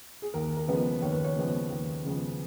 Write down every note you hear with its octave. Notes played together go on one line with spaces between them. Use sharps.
G#4
D#2 A#4
A#4
C#3 F3 G#3 B3 B4
D#2 C#5
B4
C#5
C#3 F3 G#3 B3
D#2
C#3 F3 G#3 B3